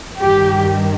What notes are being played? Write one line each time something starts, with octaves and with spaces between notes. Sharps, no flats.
G2 D#3 G4